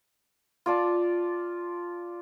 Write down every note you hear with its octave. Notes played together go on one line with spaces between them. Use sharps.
F4 D5 A5